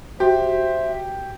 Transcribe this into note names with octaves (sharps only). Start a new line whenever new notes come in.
F#4 G4 C5 E5